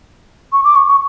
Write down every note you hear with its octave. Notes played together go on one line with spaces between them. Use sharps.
C#6
D6
C#6
C#6